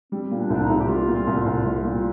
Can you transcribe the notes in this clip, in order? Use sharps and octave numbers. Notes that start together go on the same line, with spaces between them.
G3 C4
A#2
D4
C2 D4
D#4
C2
G4
G3 F4
A#2
F4
C2
F4
C2
G3 F4
A#2
F4